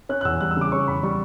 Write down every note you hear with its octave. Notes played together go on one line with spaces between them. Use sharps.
C#4 F#6
F#6
E2 E6
G3 F#6
E6
C#3 D6
C#4 C#6
E2 B5
G3 C#6